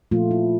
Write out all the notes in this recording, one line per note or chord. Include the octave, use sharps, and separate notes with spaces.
A#2 F3 A3 F4
E4